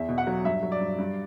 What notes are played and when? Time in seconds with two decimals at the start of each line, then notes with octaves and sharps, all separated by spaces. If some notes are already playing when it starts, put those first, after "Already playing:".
Already playing: E2 E5
0.08 B2
0.18 F#5
0.27 F#3
0.45 G2 E5
0.63 F#3
0.72 D5
0.80 G2
0.98 G2